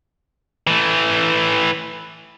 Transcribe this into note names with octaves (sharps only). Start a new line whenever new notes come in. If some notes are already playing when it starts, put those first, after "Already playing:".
E3 A3